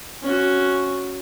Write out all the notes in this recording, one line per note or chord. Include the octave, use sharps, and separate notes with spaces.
C#4 F#4